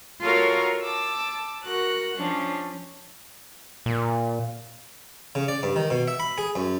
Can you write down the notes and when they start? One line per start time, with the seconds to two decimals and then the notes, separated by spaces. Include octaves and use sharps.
0.21 F4 F#4 A4 A#4 C#5 F5
0.83 A5 D6 E6
1.63 F#4 A#4 F#6
2.18 F3 C#4 D4
3.86 A#2
5.35 C#3
5.48 D5
5.63 G2
5.76 D#3
5.90 B2
6.08 E5
6.20 B5
6.38 G#4
6.55 F#2